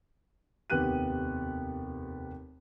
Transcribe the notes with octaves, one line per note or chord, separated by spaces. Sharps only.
F1 D#2 B3 G4 F#6 D#7